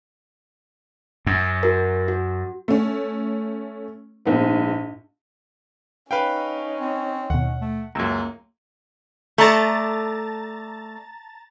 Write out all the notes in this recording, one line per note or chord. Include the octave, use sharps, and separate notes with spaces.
F#2
F#4 A#4
F#4
A3 C#4
A#1 G#2 B3
C#4 D#4 B4 F5 G5
C4
D#2 B2 F#5
A3
C#2 F#2 A#3 A#5 E6 G#6
A3 D5 A5 A#5 A6